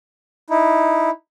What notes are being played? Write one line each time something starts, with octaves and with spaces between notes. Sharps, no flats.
D#4 E4